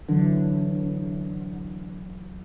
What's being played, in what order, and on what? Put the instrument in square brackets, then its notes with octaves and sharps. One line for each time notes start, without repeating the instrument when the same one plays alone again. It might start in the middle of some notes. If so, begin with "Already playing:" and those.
[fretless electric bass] D3 [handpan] E3 F#3